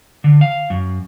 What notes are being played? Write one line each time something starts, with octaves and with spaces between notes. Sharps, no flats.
D3
F5
F#2